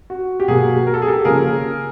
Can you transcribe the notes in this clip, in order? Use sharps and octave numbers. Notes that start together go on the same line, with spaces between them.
F#4
G4
B2 F#3 A#3 F#4 G#4
A#4
A4
G#4
G4 A4
C#3 F3 A#3 C#4 G#4 A#4